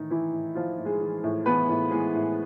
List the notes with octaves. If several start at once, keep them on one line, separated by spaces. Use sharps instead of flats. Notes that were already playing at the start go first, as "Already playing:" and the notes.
Already playing: A2 D#3 E3 D#4
E3 E4
A2
E3 F3 F4
A2
G#3 G#4
E3
A2
E3 B3 B4
A2
E3 G#3 G#4
A2